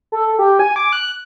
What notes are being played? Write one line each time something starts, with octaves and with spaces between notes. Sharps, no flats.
A4
G4
G#5
D6
F#6